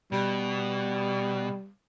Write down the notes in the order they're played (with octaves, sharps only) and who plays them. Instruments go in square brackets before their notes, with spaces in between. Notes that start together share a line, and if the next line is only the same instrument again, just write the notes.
[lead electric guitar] B2 [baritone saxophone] G3